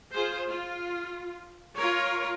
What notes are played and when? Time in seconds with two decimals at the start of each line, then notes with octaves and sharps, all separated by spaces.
0.12 F4 G#4 C5
0.49 F4
1.76 F4 A#4 C#5